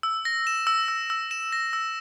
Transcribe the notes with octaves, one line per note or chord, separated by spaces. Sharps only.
E6
A#6
E7
E6
E6
E6
E7
A#6
E6